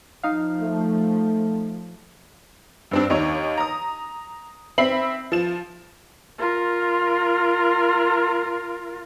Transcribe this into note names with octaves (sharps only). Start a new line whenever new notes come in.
F3 D#4 F5
A3
G2 C4 D4
D#2 D#4 C#5
A#5 D#6
C4 E5 B5 C7 F#7
F3 E7
F4 A#4